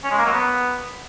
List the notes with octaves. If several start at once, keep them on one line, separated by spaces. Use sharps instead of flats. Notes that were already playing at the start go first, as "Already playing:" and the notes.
C#4
G#3
A#3
F#3
B3